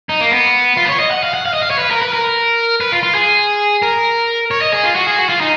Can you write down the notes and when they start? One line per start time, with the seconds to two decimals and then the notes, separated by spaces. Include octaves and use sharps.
0.09 D#4
0.20 A#3
0.32 B3
0.77 F4
0.85 B4
0.89 C#5
1.00 D#5
1.11 F#5
1.23 F5
1.34 F#5
1.46 F5
1.54 D#5
1.62 F5
1.70 C#5
1.79 B4
1.91 A#4
2.02 B4
2.13 A#4
2.81 B4
2.92 F4
3.03 F4
3.15 G#4
3.82 A#4
4.51 C#5
4.61 D#5
4.73 G#4
4.84 F4
4.96 F#4
5.07 G#4
5.18 F#4
5.29 F4
5.41 D#4